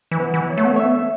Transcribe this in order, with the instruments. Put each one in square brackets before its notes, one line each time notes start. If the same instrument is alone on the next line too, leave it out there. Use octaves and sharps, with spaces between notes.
[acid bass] E3
[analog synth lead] B3
[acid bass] E3
[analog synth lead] C#5
[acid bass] A3
B3
A3
[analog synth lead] C#5
[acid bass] B3 [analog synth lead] E5